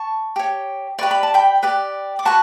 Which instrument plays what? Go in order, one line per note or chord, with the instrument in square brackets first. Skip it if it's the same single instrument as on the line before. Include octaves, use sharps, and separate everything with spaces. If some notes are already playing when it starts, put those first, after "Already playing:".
Already playing: [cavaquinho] A5 C#6
G4 C#5
G4 B4 D5 C#6
B5
A5
G5 B5
G4 B4 D5
D6
F#4 B4 A5 C#6